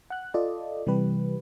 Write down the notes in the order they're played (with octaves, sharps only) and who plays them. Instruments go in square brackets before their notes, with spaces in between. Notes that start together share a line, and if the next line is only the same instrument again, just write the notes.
[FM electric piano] F#5 F#6
F4 A4 D5 D#5
C3 E3 G3 G4 B4